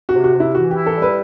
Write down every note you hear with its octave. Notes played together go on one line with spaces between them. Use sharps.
F#4
C3
F#4
C3
E4
E3 F#4
E4 G4
A4
G3
B4